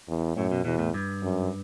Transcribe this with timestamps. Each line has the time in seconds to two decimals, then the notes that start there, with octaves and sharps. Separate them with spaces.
0.08 E2
0.36 F#2 A2
0.52 B2
0.65 E2 B2
0.79 A2
0.94 G2
1.23 F#2